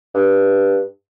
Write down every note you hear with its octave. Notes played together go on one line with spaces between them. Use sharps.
G2